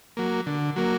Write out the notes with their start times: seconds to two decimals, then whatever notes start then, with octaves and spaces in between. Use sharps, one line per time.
0.17 F#3 A#3
0.46 D3
0.76 F#3 A#3